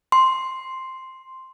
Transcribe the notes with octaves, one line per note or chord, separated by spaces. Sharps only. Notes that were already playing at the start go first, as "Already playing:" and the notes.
C6